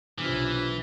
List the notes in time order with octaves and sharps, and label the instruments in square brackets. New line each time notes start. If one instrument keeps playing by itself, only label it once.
[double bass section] B1 C3 [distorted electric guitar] E3 [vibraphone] D4 F4